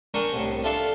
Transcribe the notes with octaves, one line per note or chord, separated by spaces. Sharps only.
D4 A#4 G5 G#5 C#6
C2 A2
D4 F4 A4 E5